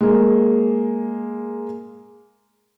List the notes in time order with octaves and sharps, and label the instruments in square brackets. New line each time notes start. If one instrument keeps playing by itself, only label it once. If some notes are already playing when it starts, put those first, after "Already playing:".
[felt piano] G#3 A#3